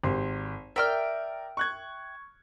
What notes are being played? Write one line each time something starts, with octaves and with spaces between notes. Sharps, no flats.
G#1 G4 C6
A#4 D5 E5 G5 F6
C#6 F#6 G#6